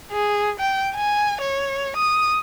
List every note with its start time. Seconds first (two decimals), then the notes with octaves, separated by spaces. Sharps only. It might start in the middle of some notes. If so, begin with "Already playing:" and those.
0.12 G#4
0.60 G5
0.95 G#5
1.41 C#5
1.97 D#6